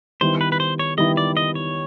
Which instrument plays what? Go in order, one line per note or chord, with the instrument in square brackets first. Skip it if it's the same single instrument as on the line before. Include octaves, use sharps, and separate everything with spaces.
[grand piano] D#3 G3 B3 E4 [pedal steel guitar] C5
[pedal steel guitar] B4
B4
C5
C#5
[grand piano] D#3 G3 B3 E4 [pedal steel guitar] D#5
[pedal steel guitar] D5
D#5
C#5